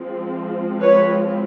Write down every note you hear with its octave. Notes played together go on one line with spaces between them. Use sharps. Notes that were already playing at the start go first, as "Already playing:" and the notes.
Already playing: F3 G#3 C4
B4 C#5